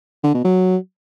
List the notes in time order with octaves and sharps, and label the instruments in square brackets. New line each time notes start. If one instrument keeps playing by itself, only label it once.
[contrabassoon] D3
B2
F#3